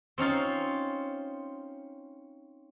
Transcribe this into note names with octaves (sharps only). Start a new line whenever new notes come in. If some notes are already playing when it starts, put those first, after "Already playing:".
C4 C#4 D#4 F4